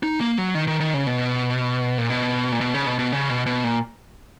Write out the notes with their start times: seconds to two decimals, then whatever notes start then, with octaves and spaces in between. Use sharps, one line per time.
0.03 D#4
0.21 A#3
0.38 F#3
0.55 D#3
0.68 D#3
0.80 D#3
0.94 C#3
1.07 B2
1.98 A#2
2.10 B2
2.52 A#2
2.61 B2
2.74 C#3
2.86 B2
2.99 B2
3.12 C#3
3.29 B2
3.46 B2
3.64 A#2